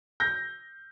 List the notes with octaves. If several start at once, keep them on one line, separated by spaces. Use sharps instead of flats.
G6 A#6